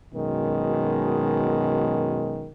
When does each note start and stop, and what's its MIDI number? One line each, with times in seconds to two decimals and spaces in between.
0.13 2.51 42
0.13 2.51 47
0.13 2.51 51
0.13 2.51 56